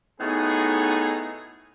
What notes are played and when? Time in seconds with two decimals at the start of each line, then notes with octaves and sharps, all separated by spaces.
0.20 A2 B3 D#4 F#4 G#4